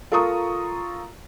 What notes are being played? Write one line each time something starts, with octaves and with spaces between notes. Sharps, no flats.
F4 A4 A#4 A#5 C#6 D#6